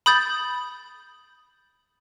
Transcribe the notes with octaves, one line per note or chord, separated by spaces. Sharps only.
B5 D#6 G6 A6